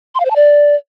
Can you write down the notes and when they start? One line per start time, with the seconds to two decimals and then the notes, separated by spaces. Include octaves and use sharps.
0.15 C6
0.20 F5
0.25 C5
0.30 A5
0.36 D5